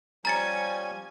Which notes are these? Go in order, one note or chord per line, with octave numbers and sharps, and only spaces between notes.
F3 G3 C#4 G#5 A#5 A6 C#7